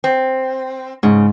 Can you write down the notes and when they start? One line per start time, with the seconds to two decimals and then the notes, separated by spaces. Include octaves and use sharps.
0.04 C4
1.03 G#2 C#3